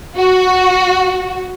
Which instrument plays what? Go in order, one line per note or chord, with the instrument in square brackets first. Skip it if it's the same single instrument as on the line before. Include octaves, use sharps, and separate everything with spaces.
[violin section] F#4